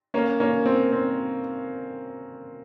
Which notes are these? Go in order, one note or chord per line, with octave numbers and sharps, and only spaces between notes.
A#3 C#4
A#3 C#4
C4
C4